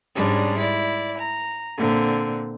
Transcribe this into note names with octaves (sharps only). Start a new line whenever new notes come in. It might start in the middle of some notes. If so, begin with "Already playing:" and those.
G#2 G3 G#3 C#4 D4
E4 D5
A#5
A#2 D3 C4